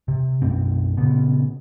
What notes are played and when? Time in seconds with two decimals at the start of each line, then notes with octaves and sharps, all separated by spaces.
0.08 C3
0.42 F#2 B2 C4
0.97 A#2 C#3 B3